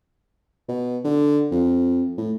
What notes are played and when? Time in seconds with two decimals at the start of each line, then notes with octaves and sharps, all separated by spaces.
0.69 B2
1.04 D3
1.51 F2
2.18 A2